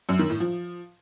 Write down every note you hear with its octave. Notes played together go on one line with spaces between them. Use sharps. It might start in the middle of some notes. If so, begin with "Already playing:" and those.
F#2
D#3
A2
F3